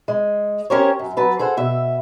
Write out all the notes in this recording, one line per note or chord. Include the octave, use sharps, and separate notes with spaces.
G#3
C#4 G4 A#4 C5 C#5
F#2
F#3 B4 A5
G#4 A4 C5 F#5
B2 E5